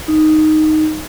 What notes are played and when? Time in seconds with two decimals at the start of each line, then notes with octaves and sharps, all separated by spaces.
0.08 D#4